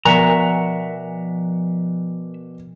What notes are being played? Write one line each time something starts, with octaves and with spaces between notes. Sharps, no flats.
B2 F3 D5 E5 F#5 A#5 F#6